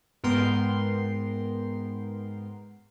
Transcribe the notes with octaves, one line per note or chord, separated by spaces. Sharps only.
G#2 B3 A#4 G5 C6